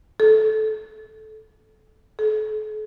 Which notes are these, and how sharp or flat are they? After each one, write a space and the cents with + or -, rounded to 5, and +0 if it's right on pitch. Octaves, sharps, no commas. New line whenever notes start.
A4 -20
A4 -45